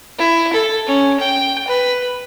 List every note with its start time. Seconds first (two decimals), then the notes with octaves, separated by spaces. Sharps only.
0.19 E4
0.53 A4
0.87 C#4
1.20 G5
1.68 B4